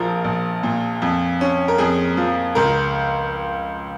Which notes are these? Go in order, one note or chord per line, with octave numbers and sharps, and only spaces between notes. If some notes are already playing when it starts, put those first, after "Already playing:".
Already playing: A#1 F3 A#4
A#1
A#2
F2
C#4
A#4
F2 G#4
F3
C#2 A#4